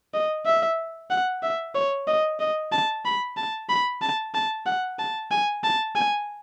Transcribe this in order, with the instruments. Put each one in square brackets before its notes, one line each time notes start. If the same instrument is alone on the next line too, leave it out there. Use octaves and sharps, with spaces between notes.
[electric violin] D#5
E5
F#5
E5
C#5
D#5
D#5
A5
B5
A5
B5
A5
A5
F#5
A5
G#5
A5
G#5